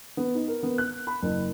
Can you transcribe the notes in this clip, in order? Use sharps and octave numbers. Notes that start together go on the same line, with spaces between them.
B3
D#4
A#4
B3
F#6
B5
F#1